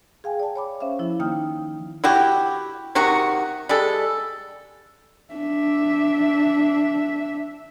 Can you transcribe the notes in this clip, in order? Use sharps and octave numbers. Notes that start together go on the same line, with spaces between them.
G#4 F5 G5 G#5
D5 A5
C#5 B5 D6
C#4 C5 E5 F5
F3 E4
D#3 A#3 D#4 G5 D#6 F6
E4 F#4 G4
C3 D#3 F#4 C#6
G3 G#3 A4
D4 E5